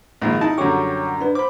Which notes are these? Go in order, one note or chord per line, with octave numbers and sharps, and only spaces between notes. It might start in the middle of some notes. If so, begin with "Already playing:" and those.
A#1 D#2 G#2
D#4 E4 A5
F#2 D3 G3 C#5 C#6 D6
D4 B4
C5 B5 D6